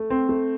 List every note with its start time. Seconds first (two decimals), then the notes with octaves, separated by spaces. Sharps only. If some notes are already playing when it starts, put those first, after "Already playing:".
Already playing: A3
0.10 C4
0.29 A3